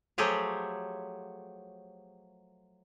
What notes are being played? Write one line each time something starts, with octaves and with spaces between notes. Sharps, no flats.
F3 F#3 A3 G4 G#4 C#5